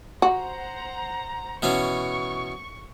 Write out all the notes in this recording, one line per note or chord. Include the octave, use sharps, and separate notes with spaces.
F#4 C5 F#5 A#5
B2 E3 C#4 C#6